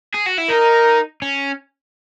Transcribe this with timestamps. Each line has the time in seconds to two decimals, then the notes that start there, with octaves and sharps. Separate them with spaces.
0.14 G#4
0.26 F#4
0.38 E4
0.49 D#4 A#4
1.22 C#4